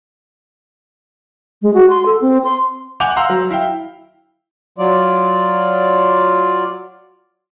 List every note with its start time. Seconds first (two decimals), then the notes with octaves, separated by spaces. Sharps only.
1.62 G#3
1.74 F#4
1.90 C6
2.06 A4
2.22 C4
2.44 C6
3.00 F#5 G#5 D6 G6 F7 F#7
3.16 F5 F#5 A#5 C6 E6
3.30 F#3
3.51 E4 F5 G5
4.78 F#3 F4 D5